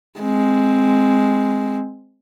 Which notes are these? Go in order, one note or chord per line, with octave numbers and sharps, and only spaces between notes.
G#3 C4